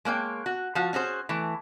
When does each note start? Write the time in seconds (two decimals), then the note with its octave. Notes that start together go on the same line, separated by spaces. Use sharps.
0.05 G#3 A#3 C#5 G5
0.46 F#4
0.75 F3 F4 F#4 F5
0.93 C#4 F#4 G#4 C5
1.29 E3 A3